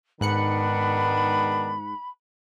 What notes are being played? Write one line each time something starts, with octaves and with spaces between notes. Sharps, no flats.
G#2 D#3 B3 D4 B5 F#6 C#7